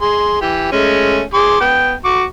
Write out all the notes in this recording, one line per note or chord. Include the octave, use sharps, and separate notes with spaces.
G#4 C6
E3 G4
G#3 A3 C#4
G#4 C6 D6
B3 G5
F#4 C#6 D6